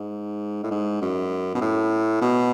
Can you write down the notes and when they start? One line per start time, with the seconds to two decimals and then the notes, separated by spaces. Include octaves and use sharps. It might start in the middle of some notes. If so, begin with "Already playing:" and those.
Already playing: G#2
0.64 A2
0.71 G#2
1.02 F#2
1.55 B2
1.61 A2
2.22 B2